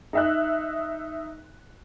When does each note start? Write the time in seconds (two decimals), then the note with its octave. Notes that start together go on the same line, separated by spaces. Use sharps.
0.13 D#4 E5 F#6